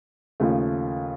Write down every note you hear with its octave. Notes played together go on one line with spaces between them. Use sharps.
D#2 C#3 F3 A3